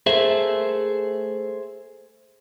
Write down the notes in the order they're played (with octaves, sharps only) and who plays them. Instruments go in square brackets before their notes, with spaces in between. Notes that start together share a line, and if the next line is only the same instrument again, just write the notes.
[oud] A3 A#3 [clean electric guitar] G#4 C5 E5